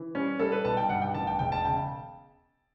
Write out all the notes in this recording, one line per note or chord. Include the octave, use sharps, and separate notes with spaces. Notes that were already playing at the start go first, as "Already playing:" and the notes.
Already playing: E3
G3 C#4
G3 A4
B4
B1 A5
G5
G2 F#5
G5
A1 A5
G5
E1 G5
A5
C#3 G5